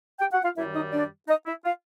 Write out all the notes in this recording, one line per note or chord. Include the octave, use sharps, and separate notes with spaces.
G4 G5
F#4 F#5
F4 F5
F#2 D#3 G3 E4 E5
D#4 D#5
D4 D5
D#4 D#5
E4 E5
F4 F5